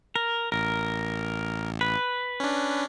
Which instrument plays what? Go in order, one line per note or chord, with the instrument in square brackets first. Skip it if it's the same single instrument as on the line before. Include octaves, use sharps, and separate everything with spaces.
[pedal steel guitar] A#4
[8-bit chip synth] A1 [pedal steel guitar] A#4
[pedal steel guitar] B4
[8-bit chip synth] C#4 D4